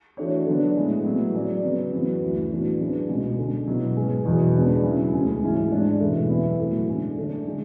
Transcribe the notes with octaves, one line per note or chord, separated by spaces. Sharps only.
E3 A3 D4 F#4 C#5
D3 F#3 B3 D4
A2 G#3 B3
A2 F#3 B3
F#3 C#4 G#4 D5
C#3 F#3 B3
F#2 E3 B3 F#4 B4
D2 C#3 E3
A2 E3 B3 D4 F#4
F#3 B3 D4 G#4 B4
C#2 B2 G#3 C#4
D3 G#3 C#4
B2 F#3 B3 E4
G#2 F#3 C#4 G#4 B4
E2 B2 F#3
C#3 G#3 B3 D4 G#4
C#3 F#3 C#4 E4
D2 C#3 G#3 C#4 G#4
G#2 E3 G#3 C#4 E4
G#2 G#3 D4
E2 B2 A3 E4
F#2 E3 B3 E4
A2 F#3 A3 E4
D3 G#3 C#4
D3 A3 D4
D3 G#3